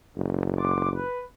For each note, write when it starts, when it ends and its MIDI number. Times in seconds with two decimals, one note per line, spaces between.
0.16 1.01 30
0.58 0.88 78
0.58 0.88 84
0.58 0.88 86
0.95 1.22 71